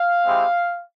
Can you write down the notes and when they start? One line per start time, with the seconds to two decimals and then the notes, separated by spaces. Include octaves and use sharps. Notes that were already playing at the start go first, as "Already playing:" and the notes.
Already playing: F5
0.26 G#3 C4 E4 G4